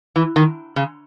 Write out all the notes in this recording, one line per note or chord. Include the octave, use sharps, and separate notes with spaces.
E3
D#3
C#3